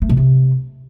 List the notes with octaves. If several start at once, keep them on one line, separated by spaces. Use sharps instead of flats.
A3
B2
C3